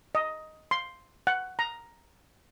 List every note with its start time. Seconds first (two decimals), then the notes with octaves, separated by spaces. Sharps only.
0.15 D#5
0.71 C6
1.27 F#5
1.59 A#5